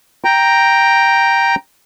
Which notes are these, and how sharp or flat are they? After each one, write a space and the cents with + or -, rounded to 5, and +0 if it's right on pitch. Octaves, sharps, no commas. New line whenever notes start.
G5 +0 A#5 +0